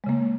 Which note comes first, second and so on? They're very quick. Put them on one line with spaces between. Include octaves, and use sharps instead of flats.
G#3 C#3 A#3